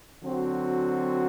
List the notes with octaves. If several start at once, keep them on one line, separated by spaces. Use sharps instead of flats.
D3 F#3 C4 F#4